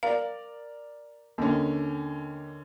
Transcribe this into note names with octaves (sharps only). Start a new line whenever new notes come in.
A#4 D5 F5
D#2 D3 C#4